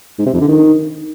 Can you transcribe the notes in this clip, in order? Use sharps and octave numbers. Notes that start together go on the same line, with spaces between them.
G#2
C3
F2
D3
D#3